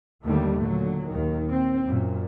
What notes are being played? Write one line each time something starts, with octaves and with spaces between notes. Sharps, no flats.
D#2 D3 D#3 G3 A3
A#2 D3 F#3
D#2 D#3
C4
F#2 A#2